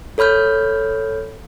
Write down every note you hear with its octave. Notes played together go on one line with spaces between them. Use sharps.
A4 C#5 B5 F6 G6